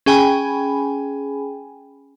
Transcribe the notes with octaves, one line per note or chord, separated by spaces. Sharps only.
C#4 G#4 G5 G#5 B5